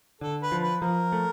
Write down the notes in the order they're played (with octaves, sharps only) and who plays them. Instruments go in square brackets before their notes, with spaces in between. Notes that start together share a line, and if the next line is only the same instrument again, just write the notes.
[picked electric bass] D3 [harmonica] A4
[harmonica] B4
[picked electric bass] F3
[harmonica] B4
[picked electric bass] F3 [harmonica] A#4
[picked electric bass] A3